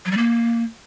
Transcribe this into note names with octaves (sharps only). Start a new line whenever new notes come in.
F#3
G3
A#3